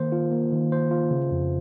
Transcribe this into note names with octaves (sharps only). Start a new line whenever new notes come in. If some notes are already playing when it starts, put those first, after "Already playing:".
Already playing: D#3 A#3 C5
F4
A#3
D#3
C5
F4
C#3
F2